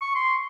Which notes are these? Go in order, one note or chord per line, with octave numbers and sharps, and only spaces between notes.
C#6
C6